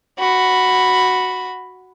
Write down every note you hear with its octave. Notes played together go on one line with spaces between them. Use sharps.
F#4 B5